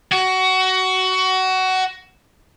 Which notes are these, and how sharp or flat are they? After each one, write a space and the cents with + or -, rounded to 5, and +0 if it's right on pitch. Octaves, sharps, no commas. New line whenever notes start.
F#4 +20